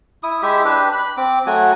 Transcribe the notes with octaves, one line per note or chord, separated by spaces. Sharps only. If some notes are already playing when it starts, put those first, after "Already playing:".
E4 D#6
G#3 E4 G4 E5
D4 G4 B4
B5
C4 D6
F#3 A3 F#4 G#5